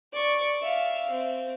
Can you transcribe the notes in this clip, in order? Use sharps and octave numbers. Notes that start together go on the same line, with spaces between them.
D5 C#6
E5 F5
C4